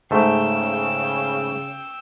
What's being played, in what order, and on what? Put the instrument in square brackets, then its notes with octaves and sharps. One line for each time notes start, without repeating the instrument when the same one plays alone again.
[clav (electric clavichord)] G#2 A3 [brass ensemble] C#3 [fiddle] G5 E6